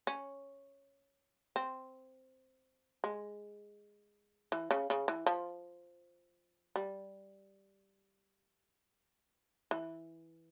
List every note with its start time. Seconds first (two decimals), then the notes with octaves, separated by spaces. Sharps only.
0.07 C#4
1.56 C4
3.04 G#3
4.52 E3
4.71 C#3
4.90 C#3
5.08 E3
5.26 F3
6.76 G3
9.71 E3